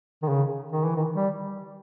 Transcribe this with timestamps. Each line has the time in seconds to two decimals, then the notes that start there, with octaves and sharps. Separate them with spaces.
0.23 D#3
0.29 C#3
0.72 D#3
0.84 E3
0.96 D#3
1.15 G3